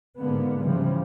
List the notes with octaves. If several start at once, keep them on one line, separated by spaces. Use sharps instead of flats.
G#2 D3 A#3 B3
C#3 E3 F3 G3